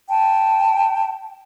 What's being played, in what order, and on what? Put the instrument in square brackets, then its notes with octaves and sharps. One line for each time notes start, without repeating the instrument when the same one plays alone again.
[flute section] G5 A5